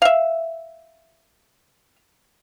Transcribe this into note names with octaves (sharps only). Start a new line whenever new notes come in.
E5 F5